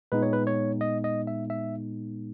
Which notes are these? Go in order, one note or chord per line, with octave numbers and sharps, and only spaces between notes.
A#2 G#3 B3 D#4 B4
C#5
B4
C#5
D#5
D#5
E5
E5